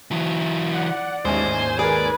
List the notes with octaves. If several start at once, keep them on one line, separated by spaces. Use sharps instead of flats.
E3 F#3
D5 F#5
A1 D#2 G#2 G#3 C5 G#5
G#4 A#4 B4 D5